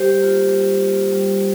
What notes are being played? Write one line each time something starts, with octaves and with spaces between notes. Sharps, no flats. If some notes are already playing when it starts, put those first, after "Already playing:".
Already playing: G3 G4 C5
A#3 F4
G3
A#3 F4
G3